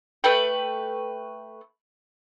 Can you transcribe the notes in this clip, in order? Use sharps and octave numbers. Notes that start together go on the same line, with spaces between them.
A3 B4 G5